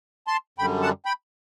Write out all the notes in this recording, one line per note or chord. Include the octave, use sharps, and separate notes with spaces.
A5 C6
F#2 D3 G3 G5 B5
F#5 A5
G5 B5